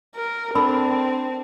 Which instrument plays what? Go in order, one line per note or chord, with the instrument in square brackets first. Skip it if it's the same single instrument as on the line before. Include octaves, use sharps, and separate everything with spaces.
[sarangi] A#4
[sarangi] C4 [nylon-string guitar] D4 [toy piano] A4 A#4 B5